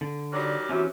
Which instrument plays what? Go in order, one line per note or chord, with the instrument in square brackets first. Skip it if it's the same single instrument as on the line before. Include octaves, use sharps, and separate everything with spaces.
[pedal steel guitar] D3
[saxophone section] D#3 F#3 G3 [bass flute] D5 [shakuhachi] D6
[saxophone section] E2 C3 [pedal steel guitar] E3 C#4 [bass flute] F#4